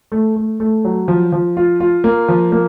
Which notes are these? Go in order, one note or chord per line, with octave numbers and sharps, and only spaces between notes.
A3
A3
A3
F#3
F3
F3
F4
F4
A#3
F3
A#3